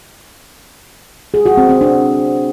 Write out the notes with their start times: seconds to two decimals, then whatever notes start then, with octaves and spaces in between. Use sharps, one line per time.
1.34 G#4
1.46 F#4
1.57 C4
1.69 C4
1.81 D4